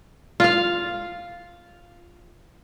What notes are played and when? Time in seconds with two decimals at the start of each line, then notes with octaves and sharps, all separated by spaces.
0.40 F4 F5